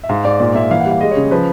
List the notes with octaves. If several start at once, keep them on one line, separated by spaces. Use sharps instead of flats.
E5
G#2 F5
G#2 D5
A#2 D5
A#3 E5
E3 F5
F#5
G3
F5
G#3 D#5
C#3 C#5
F3 B4